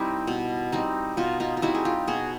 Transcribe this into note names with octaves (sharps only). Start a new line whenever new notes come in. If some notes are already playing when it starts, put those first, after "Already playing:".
Already playing: G3 C4 D#4 E4 G4
B2
G3 C4 D#4
B2 D#4 F4
D#4 F4
F4
G3 C4 D#4 E4 F#4
G#4
F4 G4
B2 F#4 G#4